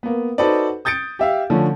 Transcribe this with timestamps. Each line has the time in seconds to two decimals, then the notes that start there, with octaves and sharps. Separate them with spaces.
0.03 A#3 B3
0.38 D#4 F#4 A4 B4 C5 D5
0.85 D#6 G6 A6 C#7 D7
1.19 G4 E5 F5
1.50 D3 F3 A3 C#4